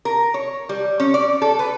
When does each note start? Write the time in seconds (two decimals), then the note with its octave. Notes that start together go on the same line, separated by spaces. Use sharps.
0.05 A#4
0.34 C#5
0.69 G3
1.00 C#4
1.14 D5
1.42 A4
1.59 B4